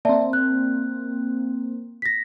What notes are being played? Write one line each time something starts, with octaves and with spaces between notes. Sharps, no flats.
A#3 C4 D5 E5 A5
F#6
A#6 B6